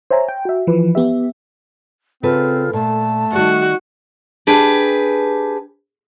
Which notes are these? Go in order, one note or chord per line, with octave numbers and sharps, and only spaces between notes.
C5 C#5 E5 G#5 A#5
G5
F#4 E5
E3 F3 B4
B3 G4 E5
C#3 C4 F4 A4 B4
A#2 A3 A5
D#3 G3 F#4 D5
D4 G4 G#4 B4